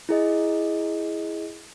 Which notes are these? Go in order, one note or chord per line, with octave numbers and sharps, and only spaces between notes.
E4 G#4 D#5